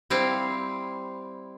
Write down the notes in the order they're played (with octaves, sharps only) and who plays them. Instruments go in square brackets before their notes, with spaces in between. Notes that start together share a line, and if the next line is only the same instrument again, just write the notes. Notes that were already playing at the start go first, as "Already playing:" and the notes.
[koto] G3 C4 E4 F5